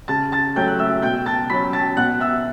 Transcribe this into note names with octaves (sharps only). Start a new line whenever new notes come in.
C#3 A5 A6
A5 A6
F#3 A3 C#4 G5 G6
F#6
E5 E6
B2 G5 G6
A5 A6
F#3 C#4 B5 B6
A5 A6
B2 F#5 F#6
E5 E6